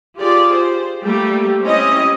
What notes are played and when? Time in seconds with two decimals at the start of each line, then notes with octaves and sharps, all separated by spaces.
0.17 F4 G4 G#4 D5
0.53 C5
1.03 G3 A3 A#3 G4
1.61 C4 C#4 E4 G4 D#5